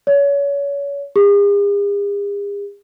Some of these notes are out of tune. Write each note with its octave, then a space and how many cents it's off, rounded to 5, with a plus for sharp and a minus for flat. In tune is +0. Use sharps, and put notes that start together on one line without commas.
C#5 +30
G#4 -45